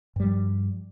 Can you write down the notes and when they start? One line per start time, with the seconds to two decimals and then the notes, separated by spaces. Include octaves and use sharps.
0.16 G2
0.20 G3
0.24 F3